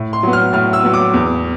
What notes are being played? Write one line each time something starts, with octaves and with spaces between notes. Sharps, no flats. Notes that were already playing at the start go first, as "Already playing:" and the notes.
Already playing: A2
C6
F#3 B3
F6
A2 F6
E6
F#3 B3
D6
E2